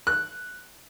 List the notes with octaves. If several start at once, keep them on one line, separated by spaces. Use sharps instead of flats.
F#6